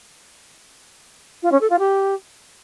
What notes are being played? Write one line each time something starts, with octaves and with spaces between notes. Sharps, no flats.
F4
C#4
A4
F4
G4